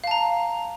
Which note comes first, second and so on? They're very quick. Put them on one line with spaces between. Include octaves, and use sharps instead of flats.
F5 A5 A#5